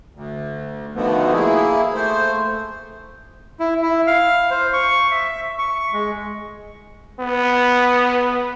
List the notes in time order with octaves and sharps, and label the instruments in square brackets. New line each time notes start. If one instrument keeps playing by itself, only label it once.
[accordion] D2
B2 D3 D#3 F3 A3 B3
A#3 E4 G#4
A3 C5
[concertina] E4
E4
F5
C5
C#6
E5
C#6
G#3
[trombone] B3